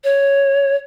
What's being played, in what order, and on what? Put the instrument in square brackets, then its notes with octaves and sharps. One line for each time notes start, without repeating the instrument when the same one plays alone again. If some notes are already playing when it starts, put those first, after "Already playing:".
[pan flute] C#5